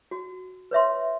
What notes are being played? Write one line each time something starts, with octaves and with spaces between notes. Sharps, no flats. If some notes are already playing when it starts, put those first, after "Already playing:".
F#4
B4 C#5 E5 C6